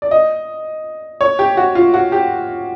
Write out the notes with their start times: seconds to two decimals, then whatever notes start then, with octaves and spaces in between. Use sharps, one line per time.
0.02 D5
0.11 D#5
1.21 C#5
1.39 G4
1.57 F#4
1.75 F4
1.94 F#4
2.12 G4